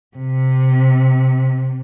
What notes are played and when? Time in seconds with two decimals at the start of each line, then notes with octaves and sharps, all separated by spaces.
0.17 C3